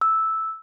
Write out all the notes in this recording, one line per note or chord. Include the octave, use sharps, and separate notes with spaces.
E6